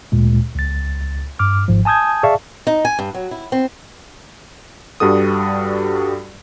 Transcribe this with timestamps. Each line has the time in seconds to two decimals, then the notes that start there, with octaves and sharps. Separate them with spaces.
0.12 D2 A#2 G#3
0.55 C#2 A6
1.39 G2 D6 F6
1.68 G#1 G#2 F3
1.85 G#5 A5 D#6 G6 G#6
2.23 G#4 D5 E5 F5 A5 C#6
2.67 D#4
2.85 G#5
2.99 G2
3.15 F#3
3.31 E4
3.52 C4
5.00 G2 G3 F#4 A4 D#6